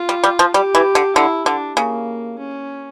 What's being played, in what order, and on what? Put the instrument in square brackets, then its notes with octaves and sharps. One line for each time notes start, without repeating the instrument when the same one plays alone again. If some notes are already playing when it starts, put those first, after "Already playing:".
Already playing: [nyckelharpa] F4
[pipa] G3
G3
F3
[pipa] G3 [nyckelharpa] G4
[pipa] E3
D3
[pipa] D3 [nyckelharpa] E4
[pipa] D3 [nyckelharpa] D4
[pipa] C#3 [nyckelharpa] A#3
[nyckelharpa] C#4